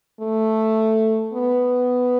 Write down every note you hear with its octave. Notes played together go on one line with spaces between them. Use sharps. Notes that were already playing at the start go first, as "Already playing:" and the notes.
A3
B3